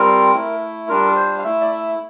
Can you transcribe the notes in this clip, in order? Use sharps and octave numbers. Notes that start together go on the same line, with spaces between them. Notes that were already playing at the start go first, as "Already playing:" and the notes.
Already playing: G3 C4 F4 A#4
A3 E4
G3 D4 F4 A#4
C5
F5
A3 E4 E5
D5
E5